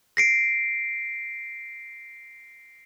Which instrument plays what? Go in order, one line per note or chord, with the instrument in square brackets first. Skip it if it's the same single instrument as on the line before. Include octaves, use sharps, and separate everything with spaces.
[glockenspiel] A#6 C7 D7